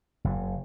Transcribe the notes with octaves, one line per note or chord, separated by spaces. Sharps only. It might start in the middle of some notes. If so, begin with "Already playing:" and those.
F#1